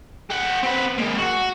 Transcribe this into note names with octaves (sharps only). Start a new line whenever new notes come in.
G4 F#5
C4 B4
G#3 A#3
F#4 F#5